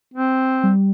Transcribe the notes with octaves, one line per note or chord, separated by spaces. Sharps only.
C4
G3